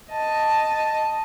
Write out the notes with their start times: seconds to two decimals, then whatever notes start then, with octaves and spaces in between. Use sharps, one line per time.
0.11 D#5 A5